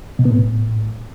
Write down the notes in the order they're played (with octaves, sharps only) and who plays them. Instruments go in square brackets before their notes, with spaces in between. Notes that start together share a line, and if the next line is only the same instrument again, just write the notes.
[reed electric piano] B2
B3
A2